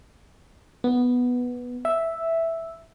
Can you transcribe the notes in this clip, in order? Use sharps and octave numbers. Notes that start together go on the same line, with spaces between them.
B3
E5